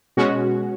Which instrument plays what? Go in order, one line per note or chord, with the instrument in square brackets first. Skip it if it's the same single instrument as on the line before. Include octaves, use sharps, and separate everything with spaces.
[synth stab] B2 G#3 C#4 F#4